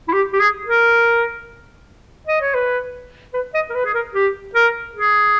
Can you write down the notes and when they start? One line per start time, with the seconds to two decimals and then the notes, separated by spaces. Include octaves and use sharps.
0.08 E4
0.13 G4
0.33 G4
0.40 G#4
0.67 A#4
2.27 D#5
2.41 C#5
2.55 B4
3.34 B4
3.54 D#5
3.70 A#4
3.75 B4
3.85 G#4
3.95 A#4
4.14 G4
4.55 A#4
4.95 G#4